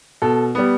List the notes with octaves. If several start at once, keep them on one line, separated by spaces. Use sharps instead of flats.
B2 A4
G3 B3